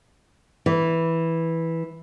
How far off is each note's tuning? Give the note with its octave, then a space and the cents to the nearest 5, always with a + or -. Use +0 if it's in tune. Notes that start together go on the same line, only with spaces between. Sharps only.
E3 -5